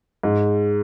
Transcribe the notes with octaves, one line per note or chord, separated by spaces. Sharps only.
G#2